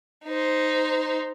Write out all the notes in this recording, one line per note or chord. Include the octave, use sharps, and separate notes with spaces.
D#4 C5